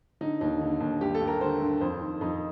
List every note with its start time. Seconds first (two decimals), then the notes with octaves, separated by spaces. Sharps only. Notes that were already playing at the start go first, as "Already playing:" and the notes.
0.21 D3 D#4
0.41 D#2 D#4
0.61 D3
0.81 D#2
1.01 G2 G4
1.15 A4
1.21 G2
1.27 A#4
1.41 D3 C5
1.60 G2
1.81 F2 C5
2.01 D#3
2.21 F2 D#4